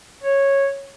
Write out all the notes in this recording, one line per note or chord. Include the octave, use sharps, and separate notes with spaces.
C#5